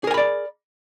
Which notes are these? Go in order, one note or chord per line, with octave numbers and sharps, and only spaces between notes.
G#4 A#4 D5 G#5 B5